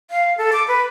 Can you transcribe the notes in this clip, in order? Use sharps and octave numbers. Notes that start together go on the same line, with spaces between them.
F5
A4
D6
B4